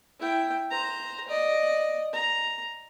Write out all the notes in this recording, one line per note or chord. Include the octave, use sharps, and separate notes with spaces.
E4 G5
C5 A#5
D5 D#5
A#5